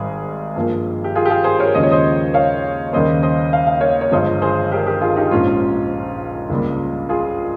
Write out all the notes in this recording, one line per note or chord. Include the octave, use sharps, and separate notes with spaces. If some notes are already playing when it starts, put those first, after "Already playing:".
Already playing: G#1 G#2 D#3 G3 G#4
G2 F3 A#3
G4
F4 G#4
G4
F4 G#4
G#4 C5
A#4 C#5
D#2 C#3 F3 G#3 D#5
C#5
C5 D#5
C#5 F5
D#2 C#3 G3 A#3 C5 D#5
C5 D#5
F5
F5
C#5 F5
C#5
G1 G2 F3 G#3 C5 D#5
G#4 C5
G4 A#4
G4 A#4
F4 G#4
D#4 G4
A#1 G#2 F3 G#3 C#4 F4
C#2 C#3 G3 A#3
F4 G#4